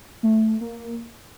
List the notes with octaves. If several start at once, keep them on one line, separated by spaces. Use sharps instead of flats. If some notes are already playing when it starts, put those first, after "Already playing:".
A3
A#3